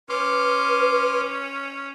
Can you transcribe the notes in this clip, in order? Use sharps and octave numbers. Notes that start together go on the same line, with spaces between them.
C#4 B4 C6 D6 F6